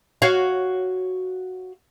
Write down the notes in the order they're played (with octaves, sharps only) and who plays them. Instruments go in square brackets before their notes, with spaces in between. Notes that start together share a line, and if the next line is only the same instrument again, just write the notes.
[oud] F#4 C#5 F5